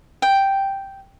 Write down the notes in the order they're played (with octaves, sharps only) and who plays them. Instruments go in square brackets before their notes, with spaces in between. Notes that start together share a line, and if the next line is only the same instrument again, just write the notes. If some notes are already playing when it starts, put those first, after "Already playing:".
[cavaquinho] G5